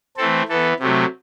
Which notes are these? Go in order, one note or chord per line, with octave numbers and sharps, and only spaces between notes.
E3 A3 C4 A4
E3 B3 A4
C3 F#3 A3